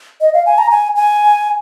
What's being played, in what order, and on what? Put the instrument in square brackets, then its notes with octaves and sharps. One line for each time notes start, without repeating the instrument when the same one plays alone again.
[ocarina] D#5
F5
G#5
A#5
G#5
G#5